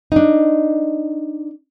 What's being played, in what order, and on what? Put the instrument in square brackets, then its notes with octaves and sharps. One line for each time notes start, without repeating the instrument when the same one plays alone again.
[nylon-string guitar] D4 D#4